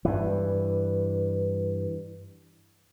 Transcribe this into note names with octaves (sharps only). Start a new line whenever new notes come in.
G2 E3